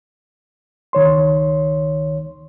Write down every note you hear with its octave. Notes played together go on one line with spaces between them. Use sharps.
C#2 D#3 C#5 C6